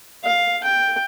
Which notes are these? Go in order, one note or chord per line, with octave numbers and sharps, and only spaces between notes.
F5
G5